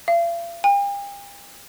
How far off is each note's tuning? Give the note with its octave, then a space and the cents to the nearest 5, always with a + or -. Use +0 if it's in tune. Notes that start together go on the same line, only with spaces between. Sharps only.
F5 -45
G5 +45